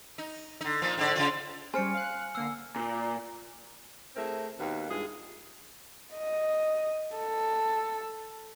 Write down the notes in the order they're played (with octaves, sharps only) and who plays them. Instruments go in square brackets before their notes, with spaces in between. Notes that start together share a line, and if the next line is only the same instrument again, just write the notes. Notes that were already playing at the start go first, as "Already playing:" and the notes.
[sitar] D#4
D3 D#4
A#2 F3
G#2 D3 D5
C#3 F3 F4
[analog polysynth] G3 C#4 [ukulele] C5 [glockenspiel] G#5 F6 C#7
[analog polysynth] F5 F#6
[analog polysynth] D3 A#3 C7 [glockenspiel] E6
[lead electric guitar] A#2
[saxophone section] A3 C4 E4 G#4 A#4
D#2 B2 D#3
G2 E3 G#3 F4 G#4
[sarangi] D#5
A4